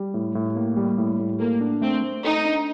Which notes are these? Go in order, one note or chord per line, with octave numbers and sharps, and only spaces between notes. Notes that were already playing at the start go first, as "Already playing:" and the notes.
Already playing: G3
A2
A2
A#3
G3
A2
A2
A#3 A4
D4
A3 C4
A3
D#4 A4
D4